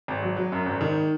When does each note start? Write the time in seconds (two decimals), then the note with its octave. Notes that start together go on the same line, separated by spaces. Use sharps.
0.08 G#1
0.23 F#3
0.37 F#3
0.52 F#2
0.66 G#1
0.81 D#3